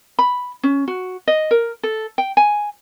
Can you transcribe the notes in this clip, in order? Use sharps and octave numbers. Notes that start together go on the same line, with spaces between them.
B5
C#4
F#4
D#5
A#4
A4
G5
G#5